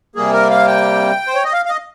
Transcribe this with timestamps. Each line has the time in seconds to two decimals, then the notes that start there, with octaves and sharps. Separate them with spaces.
0.16 C3 G3 A#3 G#4
0.33 A#4
0.51 F5
0.67 G5
1.27 C5
1.35 C#5
1.44 D#5
1.53 F5
1.65 F5
1.69 D#5